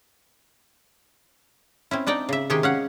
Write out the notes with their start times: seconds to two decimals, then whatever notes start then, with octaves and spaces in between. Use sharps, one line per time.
1.91 C4 C#4 E4
2.07 D4 D#4 D5 G5 A#5
2.29 C#3 E5
2.50 C3 D#3 G#3 G4 G#4 G5
2.63 C#4 F5 F#5